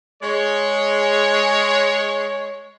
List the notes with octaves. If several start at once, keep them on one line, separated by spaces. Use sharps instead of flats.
G#3 C#5